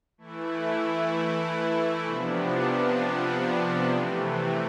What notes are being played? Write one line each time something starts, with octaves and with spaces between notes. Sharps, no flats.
E3 A3 E4
C3 F3 B3 D4
C3 E3 A3